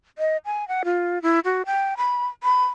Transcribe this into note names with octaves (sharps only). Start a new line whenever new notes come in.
D#5
G#5
F#5
F4
E4
F#4
G5
B5
B5